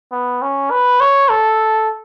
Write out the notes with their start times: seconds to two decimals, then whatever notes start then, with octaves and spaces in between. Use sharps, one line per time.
0.12 B3
0.42 C#4
0.71 B4
1.00 C#5
1.29 A4